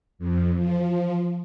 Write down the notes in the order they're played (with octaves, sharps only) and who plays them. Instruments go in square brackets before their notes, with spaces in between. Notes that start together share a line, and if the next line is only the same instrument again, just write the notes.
[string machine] F2
F3